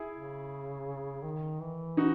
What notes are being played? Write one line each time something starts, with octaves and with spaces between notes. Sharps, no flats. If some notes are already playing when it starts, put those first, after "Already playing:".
Already playing: E4 G#4
C#3
D#3
E3
D#4 F#4